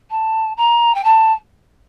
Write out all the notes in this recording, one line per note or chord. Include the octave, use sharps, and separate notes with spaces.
A5
A#5
G5
A5